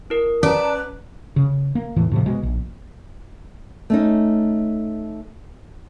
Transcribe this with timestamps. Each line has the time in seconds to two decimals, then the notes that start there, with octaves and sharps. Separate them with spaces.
0.10 E4 A#4
0.43 C#4 B4 D5 A5 A#5
1.36 C#3
1.75 A#3
1.96 E1 A2 E3
2.11 A2 C3 F3
2.26 B2 G#3
2.43 A#1
3.90 A3 C#4 D#4